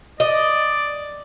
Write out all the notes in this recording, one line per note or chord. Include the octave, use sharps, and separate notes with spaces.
D5 D#5